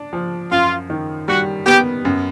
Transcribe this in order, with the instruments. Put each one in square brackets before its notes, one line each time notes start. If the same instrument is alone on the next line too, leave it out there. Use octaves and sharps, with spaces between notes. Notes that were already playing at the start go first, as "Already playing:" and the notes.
Already playing: [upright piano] D4
F3
[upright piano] F#2 [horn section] F4
[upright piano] D#3
[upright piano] G3 [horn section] F#4
[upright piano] B3 [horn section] G4
[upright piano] F#2